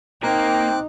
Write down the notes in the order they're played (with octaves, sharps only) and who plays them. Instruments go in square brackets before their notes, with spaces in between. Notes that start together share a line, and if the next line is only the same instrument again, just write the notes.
[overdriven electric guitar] A#3 A#4 [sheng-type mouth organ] C4 D6 F#6 [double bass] D#4 [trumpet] G5